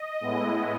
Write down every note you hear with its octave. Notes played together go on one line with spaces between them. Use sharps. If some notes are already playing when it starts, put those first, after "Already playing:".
Already playing: D#5
A2 G#3 B3 E4